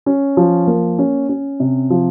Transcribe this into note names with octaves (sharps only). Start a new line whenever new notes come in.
C#4
F3
A#3
C#4
C#4
C3
F3